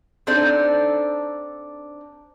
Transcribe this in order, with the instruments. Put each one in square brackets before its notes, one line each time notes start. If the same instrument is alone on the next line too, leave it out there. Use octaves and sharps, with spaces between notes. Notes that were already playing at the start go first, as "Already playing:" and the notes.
[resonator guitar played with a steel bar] C4 D4 D#4 A4 C5 D5